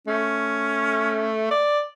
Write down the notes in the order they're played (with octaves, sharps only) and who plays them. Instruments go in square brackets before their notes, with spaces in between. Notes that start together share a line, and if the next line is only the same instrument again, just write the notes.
[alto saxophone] A3 [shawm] C#4
[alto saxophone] D5